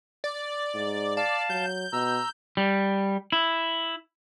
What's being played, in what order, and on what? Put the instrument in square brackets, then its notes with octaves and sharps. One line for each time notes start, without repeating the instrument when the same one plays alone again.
[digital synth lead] D5
[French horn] G#2
[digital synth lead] D5 [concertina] F5 A5
[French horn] F#3 [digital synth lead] G6
[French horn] B2 [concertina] A#5 E6
[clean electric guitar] G3
E4